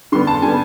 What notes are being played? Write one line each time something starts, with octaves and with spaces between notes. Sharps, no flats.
D3 G3 B3 C6
A5
D3 G3 B3 G#5